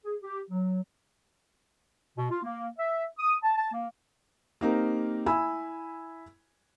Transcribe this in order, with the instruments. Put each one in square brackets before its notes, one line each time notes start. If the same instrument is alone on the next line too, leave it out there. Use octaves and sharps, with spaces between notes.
[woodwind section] G#4
G4
F#3
B2
F4
A#3
E5
D#6
A5
A5
A#3
[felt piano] A#3 C4 D#4 G4 A#4
E4 G#5 B5 E6